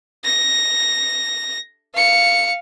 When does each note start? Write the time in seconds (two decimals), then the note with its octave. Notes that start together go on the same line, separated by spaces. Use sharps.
0.24 A#6
1.94 F5 C#7